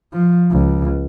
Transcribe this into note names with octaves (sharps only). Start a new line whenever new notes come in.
F3
C#2